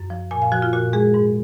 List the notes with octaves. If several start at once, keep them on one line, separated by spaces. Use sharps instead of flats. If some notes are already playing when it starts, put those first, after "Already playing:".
Already playing: F#2
F3
A#2 G#5
F5
F3 F#4
F4
A#2 F#4
G#3 G#4
G#2